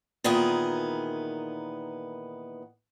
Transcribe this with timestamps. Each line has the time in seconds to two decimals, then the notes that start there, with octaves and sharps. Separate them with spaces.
0.24 A#2 D#3 E3 B3 G#4